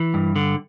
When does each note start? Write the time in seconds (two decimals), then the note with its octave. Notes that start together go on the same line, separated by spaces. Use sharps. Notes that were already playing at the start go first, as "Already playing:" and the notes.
Already playing: E3
0.14 G2
0.36 D3